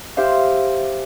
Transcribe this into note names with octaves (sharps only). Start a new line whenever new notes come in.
G4 C5 E5 F5